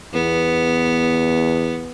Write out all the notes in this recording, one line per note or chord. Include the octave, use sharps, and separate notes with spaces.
E2 B3